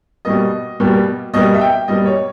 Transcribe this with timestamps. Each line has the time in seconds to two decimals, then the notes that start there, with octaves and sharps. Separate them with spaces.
0.25 B2 G3 A#3 D#5
0.80 B2 G3 A#3
1.34 B2 G3 A#3 D#5
1.55 E5
1.61 G5
1.88 B2 G3 A#3 D#5
2.06 C#5